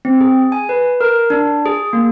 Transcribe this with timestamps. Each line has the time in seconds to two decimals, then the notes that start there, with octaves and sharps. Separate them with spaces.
0.05 C4
0.21 G#4
0.52 G#5
0.69 B4
1.01 A#4
1.30 D4
1.66 G#4
1.93 A#3